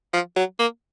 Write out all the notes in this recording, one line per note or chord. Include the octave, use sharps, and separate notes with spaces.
F3
F#3
A#3